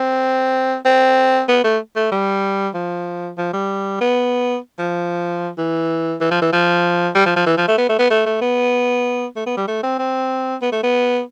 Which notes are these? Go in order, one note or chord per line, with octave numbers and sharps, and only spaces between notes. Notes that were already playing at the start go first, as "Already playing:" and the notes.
Already playing: C4
C4
B3
A3
A3
G3
F3
F3
G3
B3
F3
E3
E3
F3
E3
F3
G3
F3
F3
E3
F3
A3
B3
A3
B3
A3
A3
B3
A3
B3
G3
A3
C4
C4
B3
A3
B3